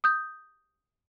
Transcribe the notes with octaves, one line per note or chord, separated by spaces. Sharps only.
D#6 G6